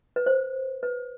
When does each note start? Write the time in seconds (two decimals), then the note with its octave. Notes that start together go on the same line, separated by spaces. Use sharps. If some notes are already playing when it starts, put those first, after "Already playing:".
0.16 B4
0.26 C5
0.83 B4